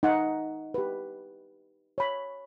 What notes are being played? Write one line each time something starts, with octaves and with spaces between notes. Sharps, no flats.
D#4 F#5
G4 B4
C#5 B5